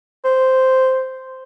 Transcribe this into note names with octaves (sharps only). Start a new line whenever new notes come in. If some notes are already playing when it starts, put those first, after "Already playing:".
C5